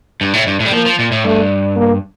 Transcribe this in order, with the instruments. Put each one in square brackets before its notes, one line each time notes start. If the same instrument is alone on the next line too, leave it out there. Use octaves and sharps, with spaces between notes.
[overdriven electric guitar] G2
A2
G2
A2
G3
[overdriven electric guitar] F3 [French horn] A#3
[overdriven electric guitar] F3
A#2
A2
[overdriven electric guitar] G2 [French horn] A3
[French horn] A#3